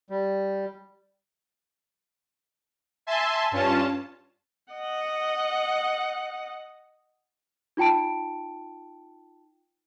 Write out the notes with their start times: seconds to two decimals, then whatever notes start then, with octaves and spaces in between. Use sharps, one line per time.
0.10 G3
3.07 E5 G#5 A5 C6
3.51 G2 C#4 F4 A5
4.72 D#5 F#5
7.77 D#4 F4 G5 A5 D7